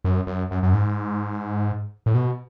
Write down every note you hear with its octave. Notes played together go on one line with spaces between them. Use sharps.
F#2
F#2
F#2
F#2
G#2
A2
B2